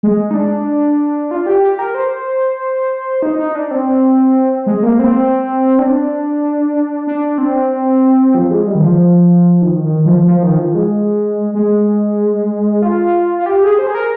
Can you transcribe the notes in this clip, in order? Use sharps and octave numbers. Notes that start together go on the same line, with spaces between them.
G#3
D#4
D4
F4
G4
G4
A#4
C5
D#4
D#4
D4
C4
G#3
A#3
C4
D4
D4
C4
F3
G#3
G3
D#3
F3
D#3
D#3
F3
F3
D#3
F3
G#3
G#3
F4
F4
G4
G#4
C5
G#4
A#4